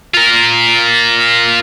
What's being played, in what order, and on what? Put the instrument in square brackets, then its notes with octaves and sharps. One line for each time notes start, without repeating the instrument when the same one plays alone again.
[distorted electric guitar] F4 A#4